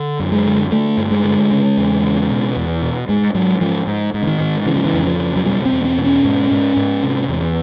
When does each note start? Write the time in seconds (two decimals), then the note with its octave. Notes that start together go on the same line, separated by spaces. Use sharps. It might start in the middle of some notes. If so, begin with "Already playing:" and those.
Already playing: D3
0.19 F#2
0.32 G#3
0.46 D3
0.71 D3 A3
0.97 G2
1.11 G#3
1.24 D3
1.51 C#3
1.77 E2
2.03 C#3
2.29 B2
2.56 E2
2.82 B2
3.09 G#2 G#3
3.34 G#2 F#3
3.61 G#2 F3
3.87 G#2
4.14 G#2
4.22 D3
4.27 D#3
4.40 G#2
4.66 C#3 E3
4.76 F3
4.85 E3
4.93 F2
5.06 F3
5.19 C#3
5.36 F#3
5.45 B2 G3
5.65 C4
5.72 E2
5.84 C4
5.98 B2
6.04 C#4
6.25 G#2
6.51 G#2
6.76 G#2
7.03 C3
7.29 E2